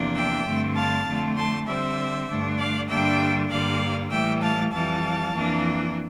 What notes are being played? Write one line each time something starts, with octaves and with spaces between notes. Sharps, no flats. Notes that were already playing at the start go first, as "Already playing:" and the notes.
Already playing: E2 C3 F3 A#3 D4
E5 G5
G2 D3 A3 C4
F5 A5
F2 D3 A3 C4
A5 C6
D3 G3 C4 C5 E5
G2 D3 A3 D4
D5 F5
G2 D3 G3 A#3 D4 E5 G5
G2 D3 G3 A#3 D5 F5
A2 E3 G3 E5 G5
F5 A5
F2 E3 G3 F5 A5
F2 E3 A#3 D4